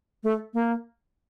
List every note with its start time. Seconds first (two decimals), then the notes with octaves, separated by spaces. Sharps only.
0.24 A3
0.54 A#3